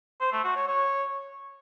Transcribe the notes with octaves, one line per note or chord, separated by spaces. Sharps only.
C5
A3
F#4
C#5
C#5